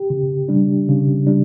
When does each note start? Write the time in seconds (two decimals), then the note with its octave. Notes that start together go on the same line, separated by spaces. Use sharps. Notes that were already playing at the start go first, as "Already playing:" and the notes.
Already playing: G4
0.10 C#3
0.49 G3 D4
0.89 C#3
1.27 G3 D4